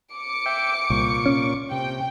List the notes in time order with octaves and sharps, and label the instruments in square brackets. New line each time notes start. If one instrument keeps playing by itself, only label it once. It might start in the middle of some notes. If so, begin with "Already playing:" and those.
[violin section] D6 C#7
[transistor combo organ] E5 G5
[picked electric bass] C2 [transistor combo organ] A#2 C#6
[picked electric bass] C#4
[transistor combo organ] C3 [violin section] G5